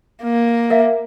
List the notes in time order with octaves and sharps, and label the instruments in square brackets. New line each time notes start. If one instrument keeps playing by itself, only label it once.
[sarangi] A#3
[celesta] A#4 E5 F5